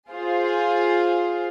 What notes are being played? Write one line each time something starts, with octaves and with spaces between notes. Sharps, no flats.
F4 G#4 C5